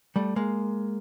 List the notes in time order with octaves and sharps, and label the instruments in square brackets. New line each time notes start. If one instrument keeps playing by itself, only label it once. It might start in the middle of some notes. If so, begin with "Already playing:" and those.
[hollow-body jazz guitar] G3 A3
G#3 A#3